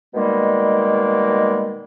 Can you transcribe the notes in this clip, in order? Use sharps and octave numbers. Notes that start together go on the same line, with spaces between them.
B2 D#3 G3 G#3 A#3